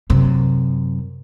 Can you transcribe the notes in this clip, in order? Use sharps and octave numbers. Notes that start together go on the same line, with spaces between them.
F#2 C3